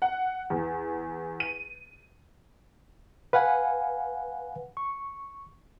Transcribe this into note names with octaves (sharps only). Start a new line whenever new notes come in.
F#5
E2
D#7
B4 F5 F#5 G#5
C#6